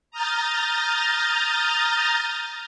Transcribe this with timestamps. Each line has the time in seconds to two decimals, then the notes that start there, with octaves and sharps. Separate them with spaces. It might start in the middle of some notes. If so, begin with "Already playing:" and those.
0.11 A#5 D#6 F6 G6 A6